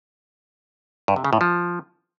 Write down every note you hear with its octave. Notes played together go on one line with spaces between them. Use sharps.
G2
C3
C#3
A2
F3